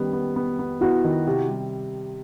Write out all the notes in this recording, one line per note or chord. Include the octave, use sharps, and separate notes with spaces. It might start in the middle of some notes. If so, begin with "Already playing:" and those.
Already playing: D#3 G3 B3 C#4
B3
B3
B3
B3 E4 F#4
D#3
C3
G3